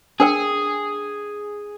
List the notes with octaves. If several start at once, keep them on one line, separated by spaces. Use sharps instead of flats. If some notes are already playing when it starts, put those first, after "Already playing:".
D4 G#4 A#4 G5